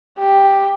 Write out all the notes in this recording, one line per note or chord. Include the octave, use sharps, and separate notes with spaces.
G4